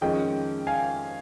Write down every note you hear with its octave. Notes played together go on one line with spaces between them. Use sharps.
F2 D#3 G#3 C#4 D#5 G5
F5 G#5